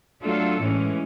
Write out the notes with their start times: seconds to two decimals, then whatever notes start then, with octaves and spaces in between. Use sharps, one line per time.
0.22 F#3 A3 D4 F4 A4
0.59 A2 E3 G#3 C#4